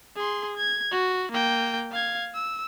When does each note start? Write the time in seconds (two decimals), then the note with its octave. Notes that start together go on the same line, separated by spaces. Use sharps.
0.16 G#4 C6
0.57 G#6
0.91 F#4
1.32 A#3 G5
1.91 F5 G#6
2.34 E6